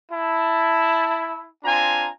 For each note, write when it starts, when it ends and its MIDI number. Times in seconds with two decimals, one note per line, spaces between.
0.12 1.45 64
0.12 1.45 81
1.63 2.09 60
1.63 2.09 62
1.63 2.09 65
1.63 2.09 80
1.63 2.09 82